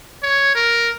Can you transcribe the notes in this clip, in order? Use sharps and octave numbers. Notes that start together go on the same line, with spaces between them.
C#5
A#4